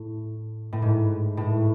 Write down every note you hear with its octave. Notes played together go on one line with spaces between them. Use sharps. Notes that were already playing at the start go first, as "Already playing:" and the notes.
Already playing: A2
A2
G#2
A2